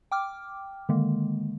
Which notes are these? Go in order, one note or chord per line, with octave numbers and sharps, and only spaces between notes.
G5 D6 F6
D3 D#3 G#3 A#3